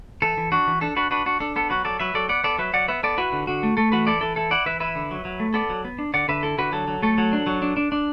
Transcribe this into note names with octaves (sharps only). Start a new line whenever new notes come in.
E3 A4
E3
D4 F#4
E3
D4 A4
D4 F#4 B4
D4 F#4 B4
D4 F#4
D4 A4
B3 A4
F#3 F#4 B4
F#3 A4 D5
F#3 B4 E5
F#3 A4 D5
B3 D5 F#5
B3 A4 D5
F#3 B4 E5
F#3 D5 F#5
B3 B4 E5
B3 A4 D5
E4 F#4 B4
D3
D3 F#4
A3
A3 A4
E3 F#4 B4
E4 A4 D5
E3 A4
E4 A4
E4 D5 F#5
E3 B4 E5
E4 B4 E5
D3
F#3
F#3
A3
B3 A4 D5
F#3
B3
D4
D3 D5 F#5
D3 B4 E5
E4 A4
D3 F#4 B4
F#3 A4
F#3
A3 A4
F#3
D4
F#3
D4
D4
D4